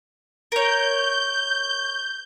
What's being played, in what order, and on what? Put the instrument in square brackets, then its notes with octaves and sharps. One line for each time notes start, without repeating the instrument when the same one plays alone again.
[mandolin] A#4 C#5 [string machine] G6